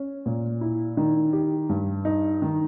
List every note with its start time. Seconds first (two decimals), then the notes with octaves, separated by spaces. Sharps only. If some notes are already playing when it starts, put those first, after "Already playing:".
Already playing: C#4
0.26 A#2
0.61 E4
0.97 D#3
1.33 G4
1.69 G2
2.05 D#4
2.42 D#3